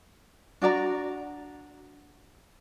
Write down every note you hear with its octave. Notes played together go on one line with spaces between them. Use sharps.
D4 F#4 D5 A#5